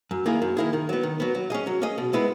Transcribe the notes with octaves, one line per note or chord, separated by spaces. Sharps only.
F#2
D#3 A#3 E4 G#4
F#2
D#3 A#3 E4 G#4
D#3
F#3 B3
D#3
F#3 B3
F#3
C#4 G#4 D#5
F#3
C#4 G#4 D#5
B2
G#3 B3 E4 B4